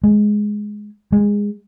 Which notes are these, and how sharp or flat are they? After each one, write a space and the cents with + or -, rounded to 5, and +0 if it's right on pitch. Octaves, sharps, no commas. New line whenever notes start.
G#3 +5
G#3 -15